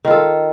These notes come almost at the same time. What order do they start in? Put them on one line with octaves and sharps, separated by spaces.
D#3 F4 A4